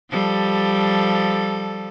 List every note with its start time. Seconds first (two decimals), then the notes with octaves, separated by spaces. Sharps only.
0.11 F3 G3 A4